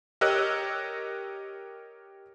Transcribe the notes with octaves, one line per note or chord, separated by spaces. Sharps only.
G4 A#4 C#5 D#5 E6 F#6